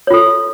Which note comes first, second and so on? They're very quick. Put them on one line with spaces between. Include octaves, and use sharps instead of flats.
C#5 F4 A4